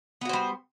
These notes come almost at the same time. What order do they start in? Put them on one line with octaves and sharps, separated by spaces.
B3 F#4 C5 G3